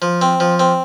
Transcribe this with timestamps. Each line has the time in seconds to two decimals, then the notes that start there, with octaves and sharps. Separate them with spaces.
0.02 F3
0.22 C4
0.40 F3
0.59 C4